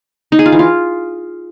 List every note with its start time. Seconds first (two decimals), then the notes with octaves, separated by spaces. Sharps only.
0.32 D#4
0.39 G#4
0.46 F4
0.52 E3
0.59 F4